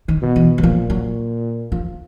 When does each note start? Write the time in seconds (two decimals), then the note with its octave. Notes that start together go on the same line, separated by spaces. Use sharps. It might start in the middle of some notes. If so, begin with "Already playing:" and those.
0.08 D#3
0.22 B2
0.36 E3
0.58 F#3
0.63 A#2 F3
0.90 F#3
1.72 F3